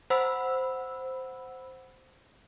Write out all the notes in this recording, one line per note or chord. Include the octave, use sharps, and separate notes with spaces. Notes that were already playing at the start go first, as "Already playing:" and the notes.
C5 F#5 B5 E6